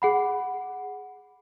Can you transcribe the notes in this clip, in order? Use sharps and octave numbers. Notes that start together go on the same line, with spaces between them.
G#4 F#5 B5